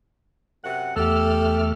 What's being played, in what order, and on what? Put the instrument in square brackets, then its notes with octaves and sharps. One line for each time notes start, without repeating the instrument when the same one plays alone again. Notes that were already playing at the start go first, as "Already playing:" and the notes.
[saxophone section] F#2 C3 F#5
[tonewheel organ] E2 A3 F6 [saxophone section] G4 A4